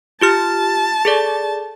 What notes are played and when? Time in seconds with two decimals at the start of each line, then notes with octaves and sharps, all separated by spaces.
0.22 F4 G4 A5 F6
1.05 G#4 A4 D5